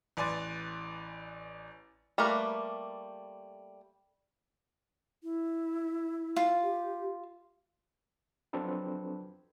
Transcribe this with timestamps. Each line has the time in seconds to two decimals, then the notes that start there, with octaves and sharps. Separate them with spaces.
0.17 A1 B4 D5 G#5 C6 A6
2.18 G3 A3 A#3 A#4 B4
5.23 E4
6.36 F4
6.63 G4
8.53 F3 F#3 C4 D4 A4 B4